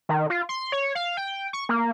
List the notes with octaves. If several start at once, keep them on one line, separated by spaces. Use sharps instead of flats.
D#3
F4
C6
C#5
F5
G5
C#6
A#3